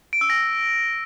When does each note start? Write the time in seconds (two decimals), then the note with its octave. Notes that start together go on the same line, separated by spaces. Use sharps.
0.13 D7
0.21 E6
0.30 A#6